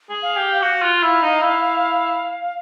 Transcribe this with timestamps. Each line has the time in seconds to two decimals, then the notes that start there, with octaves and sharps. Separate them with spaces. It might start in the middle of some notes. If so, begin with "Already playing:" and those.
0.09 G#4
0.23 F5
0.37 G4
0.62 F#4 F5
0.82 F4
1.03 E4
1.22 D#4
1.41 E4